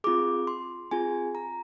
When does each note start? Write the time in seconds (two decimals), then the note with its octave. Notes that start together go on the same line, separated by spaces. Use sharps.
0.04 C4 F4 G#4 D6
0.47 C6
0.91 C4 F4 G#4 G#5
1.35 A#5